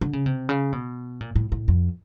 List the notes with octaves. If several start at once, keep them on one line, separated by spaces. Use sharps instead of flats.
D3
C#3
C3
C#3
B2
A#2
A2
A2
F2